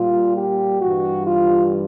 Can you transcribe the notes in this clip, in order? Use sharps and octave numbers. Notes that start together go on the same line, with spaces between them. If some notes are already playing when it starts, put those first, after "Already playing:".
Already playing: A#2 G3 F4
G4
G2 E3 G3 F#4
F4